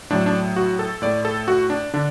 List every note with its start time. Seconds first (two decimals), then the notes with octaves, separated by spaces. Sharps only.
0.10 A2 F#3 A3 D4
0.26 D4
0.56 F#4
0.79 A4
1.02 A2 A3 D5
1.25 A4
1.48 F#4
1.70 D4
1.94 D3 D4